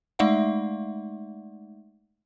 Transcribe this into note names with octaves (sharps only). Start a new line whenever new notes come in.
G#3 A3 D#4 D5 E5 F#5